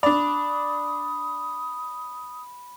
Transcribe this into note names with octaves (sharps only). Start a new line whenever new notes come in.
D4 D5 B5 D#6